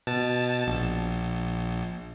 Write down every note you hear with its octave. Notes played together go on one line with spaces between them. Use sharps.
B2 A5
A#1